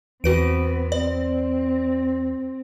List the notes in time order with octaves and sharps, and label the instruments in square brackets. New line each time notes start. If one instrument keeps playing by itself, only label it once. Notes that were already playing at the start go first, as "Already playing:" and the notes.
[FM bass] E2 [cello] B3 C4 [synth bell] F#4 B4 D7
[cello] C4 [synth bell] D5